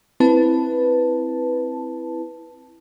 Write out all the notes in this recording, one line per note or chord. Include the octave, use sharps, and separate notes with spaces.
C4 E4 B4 A5